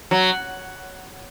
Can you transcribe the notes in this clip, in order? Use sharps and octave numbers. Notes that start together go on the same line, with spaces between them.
F#3